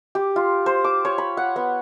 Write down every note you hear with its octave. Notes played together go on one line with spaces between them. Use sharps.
G4
F4
C5
D6
C#5
B5
F#5
B3